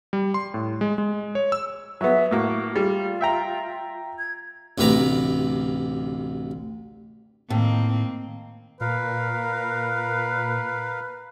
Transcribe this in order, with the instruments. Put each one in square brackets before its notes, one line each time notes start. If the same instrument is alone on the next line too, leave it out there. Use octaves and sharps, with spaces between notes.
[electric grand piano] G3
C6
A2
G#3
G#3
C#5
E6
[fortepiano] F#3 B3 [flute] E5
[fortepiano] A2 A#3 [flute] F#4
[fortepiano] G3 [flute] F4
[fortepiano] E5 G5 A#5
[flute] G#6
[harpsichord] A1 D2 C3 B4 A#5 D6
[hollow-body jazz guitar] A2 [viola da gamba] D#3 A#3 C4
[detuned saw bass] A#2 [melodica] A#4 F5 [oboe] B4